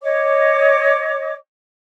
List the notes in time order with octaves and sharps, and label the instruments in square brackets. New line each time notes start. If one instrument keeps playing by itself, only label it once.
[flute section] C#5 D#5 D6